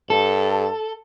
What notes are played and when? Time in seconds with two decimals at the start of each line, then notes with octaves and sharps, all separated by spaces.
0.10 G2 A4